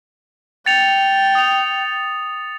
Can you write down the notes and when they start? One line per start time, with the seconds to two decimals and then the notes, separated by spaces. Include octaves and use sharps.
0.66 G5 A6 C#7 F7
1.35 D#6 F7